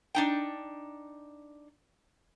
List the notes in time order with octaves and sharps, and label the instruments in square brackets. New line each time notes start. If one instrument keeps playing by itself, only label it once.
[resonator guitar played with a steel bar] D4 D#4 G5